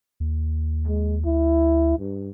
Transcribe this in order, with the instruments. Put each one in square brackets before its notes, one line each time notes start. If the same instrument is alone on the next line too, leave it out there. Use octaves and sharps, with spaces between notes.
[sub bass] D#2
[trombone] G#3
[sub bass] D2 [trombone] E4
[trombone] G2